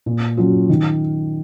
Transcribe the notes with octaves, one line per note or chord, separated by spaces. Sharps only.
A#2
F#3 C#4 F4
D#3